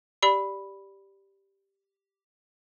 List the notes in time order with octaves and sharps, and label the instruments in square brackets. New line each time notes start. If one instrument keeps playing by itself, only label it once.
[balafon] G4 D5 B5